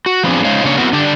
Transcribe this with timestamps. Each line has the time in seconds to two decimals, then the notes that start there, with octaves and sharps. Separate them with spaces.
0.06 F#4
0.23 F3 B3 C4 D4 G#4
0.45 G#3 C#4 D#4 C5 C#5 F5
0.64 C#3 A#3 D4 C#5
0.77 B3 C4 E4 F#4 A#4
0.93 D3 D4 G4 D5